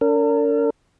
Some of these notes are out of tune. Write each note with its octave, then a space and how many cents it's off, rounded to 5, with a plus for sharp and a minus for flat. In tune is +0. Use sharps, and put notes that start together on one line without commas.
D4 -45 A#4 -35